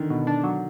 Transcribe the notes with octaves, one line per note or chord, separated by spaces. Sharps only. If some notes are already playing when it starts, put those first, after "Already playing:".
Already playing: D3 D#3
B2
D4
F#3